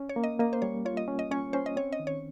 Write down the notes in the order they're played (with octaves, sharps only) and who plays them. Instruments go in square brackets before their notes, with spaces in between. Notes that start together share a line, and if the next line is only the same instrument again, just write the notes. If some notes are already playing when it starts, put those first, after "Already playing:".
Already playing: [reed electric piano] C#4
[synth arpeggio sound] C#5
[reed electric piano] A#3
[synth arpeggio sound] D#5
[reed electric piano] A#3 [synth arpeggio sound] D#5
[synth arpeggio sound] C5
[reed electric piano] G3 [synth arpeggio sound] C#5
[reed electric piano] F4 [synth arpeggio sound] C#5
[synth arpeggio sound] D#5
[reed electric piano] C#4
[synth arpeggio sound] D#5
[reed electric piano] C#4 [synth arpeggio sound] C#5
[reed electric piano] C#4 [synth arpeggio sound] C5
[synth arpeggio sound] D#5
[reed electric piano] C4 [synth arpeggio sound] C#5
[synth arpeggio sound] D#5
[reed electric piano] D#3
[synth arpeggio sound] C#5